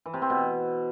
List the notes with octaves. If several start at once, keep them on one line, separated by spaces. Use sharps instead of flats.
E3
C3
C4
B2